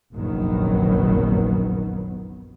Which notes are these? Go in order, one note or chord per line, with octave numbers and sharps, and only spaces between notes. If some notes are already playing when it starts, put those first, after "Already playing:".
F1 A#1 F#2 D#3 F#3 B3